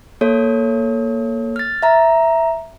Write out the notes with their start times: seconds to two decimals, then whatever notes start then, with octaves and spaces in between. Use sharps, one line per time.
0.21 A#3 A4 C#5
1.56 F6 A6
1.83 E5 A#5